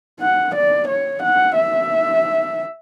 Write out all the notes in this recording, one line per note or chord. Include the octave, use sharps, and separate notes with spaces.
F#5
D5
C#5
F#5
E5